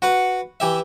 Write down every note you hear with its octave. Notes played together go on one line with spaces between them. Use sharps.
F#4 B4 F#5
E3 G4 E5